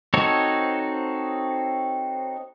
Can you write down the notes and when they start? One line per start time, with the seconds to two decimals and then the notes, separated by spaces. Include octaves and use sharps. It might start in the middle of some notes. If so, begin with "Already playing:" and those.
0.14 C4 D#4 F#4 A4 C#5